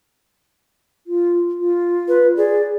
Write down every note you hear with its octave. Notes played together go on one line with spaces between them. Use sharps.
F4
F4
B4
G#4 D5